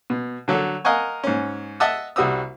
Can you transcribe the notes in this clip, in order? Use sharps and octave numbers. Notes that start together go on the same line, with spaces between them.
B2
D3 F#3 A4
A#4 D#5 F5 F#5 G#5 C#6
G#2 C#4
D#5 E5 F#5 A5 D#6 E6
C2 G3 F#4 C5 D#6 E6